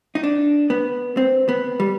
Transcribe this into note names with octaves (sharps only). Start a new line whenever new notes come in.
D#4
D4
B3
C4
B3
G3